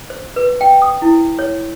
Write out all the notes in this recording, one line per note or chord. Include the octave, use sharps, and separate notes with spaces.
C5
B4
G5
D#6
E4
C#5